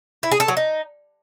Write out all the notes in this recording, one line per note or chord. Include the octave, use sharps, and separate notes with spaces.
E4
G#4
A4
F#3
D#4